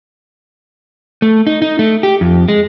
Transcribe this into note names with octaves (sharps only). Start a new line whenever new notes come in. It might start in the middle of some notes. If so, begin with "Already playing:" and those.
A3
D#4
D#4
A3
G4
F2
G#3